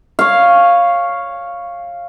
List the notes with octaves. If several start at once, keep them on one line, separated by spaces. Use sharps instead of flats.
C#5 F5